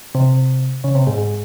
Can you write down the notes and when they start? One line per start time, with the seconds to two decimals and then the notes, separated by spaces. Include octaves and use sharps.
0.15 C3
0.84 C#3
0.95 C3
1.07 G#2
1.18 G#2